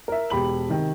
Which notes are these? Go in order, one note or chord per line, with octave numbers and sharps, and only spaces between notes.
A#4 E5
E1 G4 B5 F#7
C3 D#3